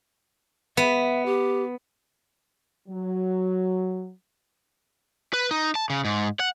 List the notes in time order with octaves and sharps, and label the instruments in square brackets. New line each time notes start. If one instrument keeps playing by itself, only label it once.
[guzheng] B3 [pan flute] E5
[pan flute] G4
[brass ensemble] F#3
[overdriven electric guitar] B4
D#4
A5
C#3
G#2
F#5